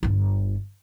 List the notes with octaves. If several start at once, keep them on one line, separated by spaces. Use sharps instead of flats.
G1 F4